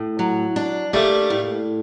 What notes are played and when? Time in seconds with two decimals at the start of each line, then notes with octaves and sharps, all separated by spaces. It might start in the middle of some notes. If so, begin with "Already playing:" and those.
Already playing: A2
0.19 F#3
0.56 D4
0.93 G3 A3 A#3
1.30 A2